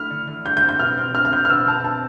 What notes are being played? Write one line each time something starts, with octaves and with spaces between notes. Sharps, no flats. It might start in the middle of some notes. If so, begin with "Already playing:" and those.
Already playing: A3 E4 F6
D3
D3
G3 G6
G6
C4
G6
B2 F6
C4
C4 F6
F6
B2 G6
F6
B2 E6
C4 A5
A5